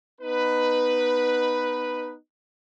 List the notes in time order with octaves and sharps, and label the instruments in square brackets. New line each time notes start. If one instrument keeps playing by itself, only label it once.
[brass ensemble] B3 D#4 B4